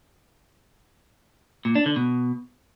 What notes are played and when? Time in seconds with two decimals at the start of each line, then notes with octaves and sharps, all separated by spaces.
1.65 A#2
1.75 D4
1.86 D3
1.96 B2